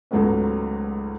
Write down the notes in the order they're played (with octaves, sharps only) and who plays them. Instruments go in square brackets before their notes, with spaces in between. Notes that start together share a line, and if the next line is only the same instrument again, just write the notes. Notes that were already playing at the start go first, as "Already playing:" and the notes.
[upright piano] C#2 G#2 F#3 A3 B3 C#4